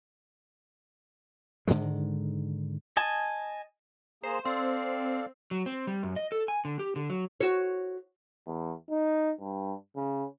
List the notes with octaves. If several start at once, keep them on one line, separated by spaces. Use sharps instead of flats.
G#2 D3 D#3 G#3
D#5 G#5 A5
A#3 G#4 C5 A#5
C4 A4 D5 F5
F#3
C4
G3
F#2
D#5
A4
G#5
D3
G4
D3
F#3
F#4 C#5
E2
D#4
G2
C#3